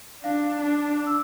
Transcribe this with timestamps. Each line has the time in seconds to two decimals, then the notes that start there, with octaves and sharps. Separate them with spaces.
0.23 D4 F5
0.61 D4
0.97 D6
1.06 E6